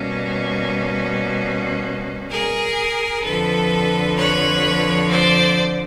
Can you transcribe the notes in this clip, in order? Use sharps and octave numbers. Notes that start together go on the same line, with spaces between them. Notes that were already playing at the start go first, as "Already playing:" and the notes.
Already playing: B2 G3 A#3 C#4
G#4 A#4
F2 D3 F3 A4 B4
B4 C#5
C5 D5